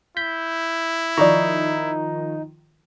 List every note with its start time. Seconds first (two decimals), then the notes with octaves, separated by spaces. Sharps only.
0.17 E4 G6 B6
1.17 D#3 F3 D#4 D5 A#5 C#6